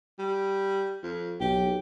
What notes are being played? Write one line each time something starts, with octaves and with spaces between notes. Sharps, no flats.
G3
F2
B1 G4